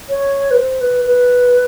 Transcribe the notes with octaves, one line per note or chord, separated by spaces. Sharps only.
C#5
B4
C5
B4
B4